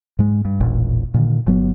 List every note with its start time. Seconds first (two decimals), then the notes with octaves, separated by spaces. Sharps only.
0.19 G#2 G#3
0.45 G2
0.60 E1 A1 A#2
1.14 A#2 D3 D#3
1.47 G1 F#3 B3